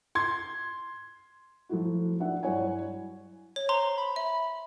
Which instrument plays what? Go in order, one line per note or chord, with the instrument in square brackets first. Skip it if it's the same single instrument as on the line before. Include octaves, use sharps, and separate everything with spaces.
[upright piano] C6 G#6
[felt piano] F3 F#3 A3 E4 F#4
D4 E5 F#5
G2 F#3 E4 C#5 F#5 G#5
[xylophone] C#5
[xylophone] C5 A#5 [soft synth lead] C6
[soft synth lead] B5
[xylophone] E5